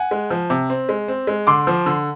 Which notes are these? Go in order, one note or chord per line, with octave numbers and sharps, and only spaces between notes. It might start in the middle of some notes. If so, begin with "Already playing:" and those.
Already playing: F#5 G#5
G#3
F3
C3
C4
G#3
C4
G#3
D3 C6 D6
F3
D3